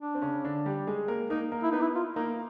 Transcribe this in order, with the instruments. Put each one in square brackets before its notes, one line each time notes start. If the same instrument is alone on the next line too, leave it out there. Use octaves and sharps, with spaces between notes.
[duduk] D4
[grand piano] C4
C#3 C#4
D3 D4
G3 G4
G#3 G#4
A#3 A#4
[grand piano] A#3 A#4 [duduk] D#4
[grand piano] A#3 A#4
[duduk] E4
[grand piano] B3 B4 [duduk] D#4
[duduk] E4
F4
[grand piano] A#3 A#4 [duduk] D#4